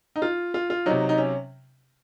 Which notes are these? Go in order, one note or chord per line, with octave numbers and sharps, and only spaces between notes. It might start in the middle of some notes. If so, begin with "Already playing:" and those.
D#4
F4
F4
F4
C3 F#3 D#4
D#4
C#4